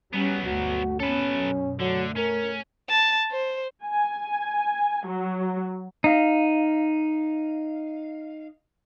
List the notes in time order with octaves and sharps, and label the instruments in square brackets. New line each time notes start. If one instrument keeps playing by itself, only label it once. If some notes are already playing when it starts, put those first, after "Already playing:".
[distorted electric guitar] F#3 B3 [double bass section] G3 C#4
[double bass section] G1 D2 A3 [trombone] F#4
[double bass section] A#2 B3 [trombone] C#4 [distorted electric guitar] A4 B4
[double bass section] F#2 B2
[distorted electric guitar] D3 [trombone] F#3 [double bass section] A3
[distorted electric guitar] C#4 [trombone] A#4
[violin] A5
C5
[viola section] G#5
F#3
[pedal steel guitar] D#4 F5